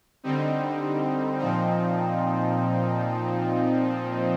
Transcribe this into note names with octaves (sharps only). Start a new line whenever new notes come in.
D3 G3 C4 D#4
A#2 F3 C4 D#4